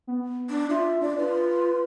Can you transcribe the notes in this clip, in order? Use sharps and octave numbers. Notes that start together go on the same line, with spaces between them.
B3
D4
F4 E5
D4 D5
F4 B4